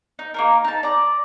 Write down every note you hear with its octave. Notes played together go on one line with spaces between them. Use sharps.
D#4
A#3 D#4 A#4
D#4 A5
D5 A#5